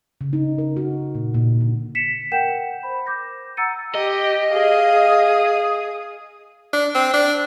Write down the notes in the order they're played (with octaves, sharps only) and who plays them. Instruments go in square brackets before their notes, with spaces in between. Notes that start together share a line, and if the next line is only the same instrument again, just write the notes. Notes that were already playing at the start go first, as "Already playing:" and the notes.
[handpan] C#3
D#4
A#4
F#4
A#2
A#2
D3
[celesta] B6 C#7 E7
A#4 F#5 G5 G6 E7
C5 B5
D6 G6 A#6
F#5 A#5 E6 A6 C#7 D#7
[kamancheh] G4 [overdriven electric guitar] D#5
[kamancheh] G#4 D#6 [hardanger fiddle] F5
[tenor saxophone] D4
C4
D4